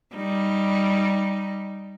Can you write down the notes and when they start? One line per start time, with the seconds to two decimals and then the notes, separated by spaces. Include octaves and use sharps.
0.15 G3 D#4